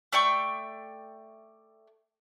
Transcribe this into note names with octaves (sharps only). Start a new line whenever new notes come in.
A3 D5 G5 C#6